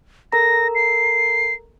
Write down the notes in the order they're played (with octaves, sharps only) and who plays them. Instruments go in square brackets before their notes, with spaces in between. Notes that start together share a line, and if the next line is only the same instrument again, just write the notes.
[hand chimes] A4 A#4 A#5 [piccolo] A#6
[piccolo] C7